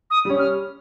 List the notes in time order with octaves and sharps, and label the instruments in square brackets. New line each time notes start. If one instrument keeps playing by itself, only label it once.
[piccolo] D#6
[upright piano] G3 C#4
[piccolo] F6